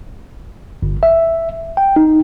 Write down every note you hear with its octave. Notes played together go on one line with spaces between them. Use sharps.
G1
E5
G5
D#4